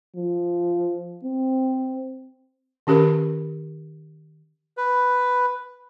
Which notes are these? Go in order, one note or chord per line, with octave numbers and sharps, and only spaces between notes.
F3
C4
D#3 C#4 G4 A#4 B5
B4